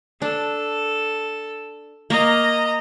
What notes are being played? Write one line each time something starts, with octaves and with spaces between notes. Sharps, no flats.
D4 A4
A#3 D#5 A#5